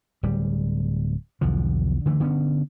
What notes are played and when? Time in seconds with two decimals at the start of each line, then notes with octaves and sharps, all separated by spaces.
0.23 D1 G3
1.41 B1 E2 D3 F3
2.06 D3 E3 A3
2.20 D3 B3 C#4